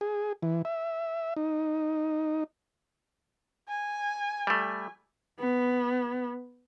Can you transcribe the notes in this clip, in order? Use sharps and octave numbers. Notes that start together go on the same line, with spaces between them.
G#4
E3
E5
D#4
G#5
G3 A3
B3